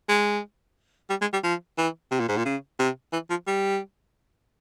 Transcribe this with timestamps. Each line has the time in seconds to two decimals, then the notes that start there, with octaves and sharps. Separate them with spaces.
0.09 G#3
1.10 G3
1.21 G#3
1.33 G3
1.44 F3
1.78 E3
2.11 C3
2.20 A#2
2.29 G#2
2.37 A#2
2.46 C#3
2.79 C3
3.13 E3
3.30 F3
3.47 G3